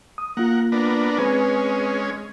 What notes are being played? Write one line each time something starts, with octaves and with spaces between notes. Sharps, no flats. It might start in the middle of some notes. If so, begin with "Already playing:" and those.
D#6
A#3 F4 A#4 F#5
B3 D4 A#4
G#3 C4 C#4 B4